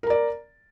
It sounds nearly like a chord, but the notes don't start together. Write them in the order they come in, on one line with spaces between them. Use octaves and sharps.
A#4 A#5 D5